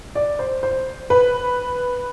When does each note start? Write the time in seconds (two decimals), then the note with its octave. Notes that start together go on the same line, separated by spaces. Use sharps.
0.15 D5
0.39 C5
0.63 C5
1.10 B4